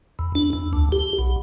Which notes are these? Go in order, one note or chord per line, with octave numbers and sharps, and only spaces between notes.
E2
D4
E2
D2
G4
B1